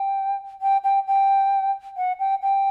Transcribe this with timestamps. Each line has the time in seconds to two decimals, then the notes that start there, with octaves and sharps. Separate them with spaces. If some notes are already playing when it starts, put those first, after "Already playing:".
Already playing: G5
0.62 G5
0.84 G5
1.07 G5
1.97 F#5
2.19 G5
2.42 G5